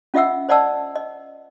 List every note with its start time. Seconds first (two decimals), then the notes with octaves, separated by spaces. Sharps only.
0.14 C#4 F4 D#5 E5 F#5 E6
0.49 C5 D5 D#5 F#5 A5 E6
0.96 D#5